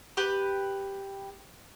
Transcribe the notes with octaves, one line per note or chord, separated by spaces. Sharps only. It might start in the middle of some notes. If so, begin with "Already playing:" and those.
G4 B4